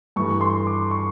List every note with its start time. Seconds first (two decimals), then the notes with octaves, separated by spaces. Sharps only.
0.16 G2 E3 A3 C#6
0.41 C6
0.67 D6
0.91 C#6